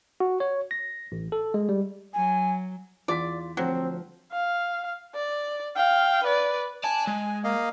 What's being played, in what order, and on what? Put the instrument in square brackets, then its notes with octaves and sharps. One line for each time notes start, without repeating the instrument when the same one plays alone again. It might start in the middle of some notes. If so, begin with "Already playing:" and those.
[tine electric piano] F#4
C#5
A#6
A1
A4
G#3
G3
[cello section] F#3 [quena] G#5
[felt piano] E2 B6 [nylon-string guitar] F4 [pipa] D5
[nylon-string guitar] D2 F3 [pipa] F#3 [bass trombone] C4
[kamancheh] F5
D5
F5 G5
B4 D5
[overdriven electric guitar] D5 A5 [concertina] G#5
[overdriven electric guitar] G#3
[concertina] A#3 D#5 F5